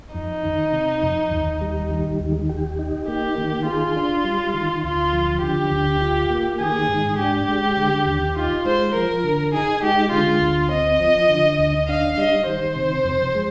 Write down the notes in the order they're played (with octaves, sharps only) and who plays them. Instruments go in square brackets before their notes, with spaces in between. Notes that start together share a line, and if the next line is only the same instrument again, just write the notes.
[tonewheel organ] F2 [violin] D#4
[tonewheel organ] D#3
C3
F2
D#2
G3
D#3
D#2
G4
D#4
[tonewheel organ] A#3 [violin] G4
[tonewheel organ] D#3
[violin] F4 [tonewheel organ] G#4
[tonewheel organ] D4
G3
D#3
[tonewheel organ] D2 [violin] F4
[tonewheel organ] F3
[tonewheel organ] D3 [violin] G4
[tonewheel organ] D2
F4
A#3
[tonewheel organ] D#3 [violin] G#4
[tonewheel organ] G#2
[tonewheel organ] D4 [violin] G4
[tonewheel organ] G#3
D3
D#2
[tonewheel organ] D#4 [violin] F4
[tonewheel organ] G#3 [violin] C5
[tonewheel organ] F3 [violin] A#4
[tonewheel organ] D3
[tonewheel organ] D#4 [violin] G#4
[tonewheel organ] G#3 [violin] G4
[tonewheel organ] D3 [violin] F4
[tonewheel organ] D2
[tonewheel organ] C4 [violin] D#5
[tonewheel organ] F3
D3
D2
[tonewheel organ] D4 [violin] F5
[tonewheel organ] G3 [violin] D#5
[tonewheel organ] D#3 [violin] C5
[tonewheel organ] C3
F2
G#3